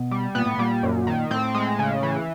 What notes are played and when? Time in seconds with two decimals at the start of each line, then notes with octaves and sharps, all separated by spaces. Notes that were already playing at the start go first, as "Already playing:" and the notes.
Already playing: B2
0.11 G3
0.35 A#2 B3
0.46 A2
0.57 A#2 G3
0.83 F#2
1.07 D#3
1.30 A2 C4
1.54 G#3
1.79 C#3
2.03 E3